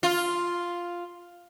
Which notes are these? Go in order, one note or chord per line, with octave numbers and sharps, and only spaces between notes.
F4